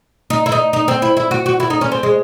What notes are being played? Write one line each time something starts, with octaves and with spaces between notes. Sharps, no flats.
D#4
E4
D#4
D#4
C4
E4
E4
F#4
F#4
E4
D#4
C#4
C4
G#3